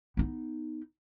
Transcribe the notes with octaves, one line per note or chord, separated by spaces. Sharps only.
B3 D#4